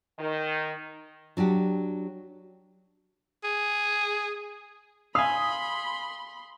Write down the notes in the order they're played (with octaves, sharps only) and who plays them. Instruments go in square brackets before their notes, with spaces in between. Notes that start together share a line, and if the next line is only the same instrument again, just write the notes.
[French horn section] D#3
[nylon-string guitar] F#3 D4 F#4 G4
[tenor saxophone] G#4
[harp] F5 G#5 [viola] B5 C6 [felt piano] D#6